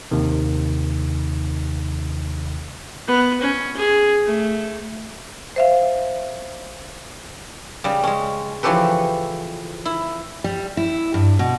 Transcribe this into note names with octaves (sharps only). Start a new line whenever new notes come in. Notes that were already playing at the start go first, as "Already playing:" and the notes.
D#2 C3 D#3
B3
C#4
G#4
A3
C5 E5 F5
C#3 G3
G#3 C#4
E3 F3 C#4 G4 A4 B4
E4
G3
E4
G2
B2